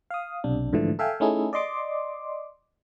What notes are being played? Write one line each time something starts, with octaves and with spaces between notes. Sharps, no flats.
F5 D#6
B1 C3 D4
G#2 D3 E3 F3 A3
A4 E5 F5 G5 G#5
A3 C#4 D#4 E4 G#4 A4
D5 D#5 C6 D6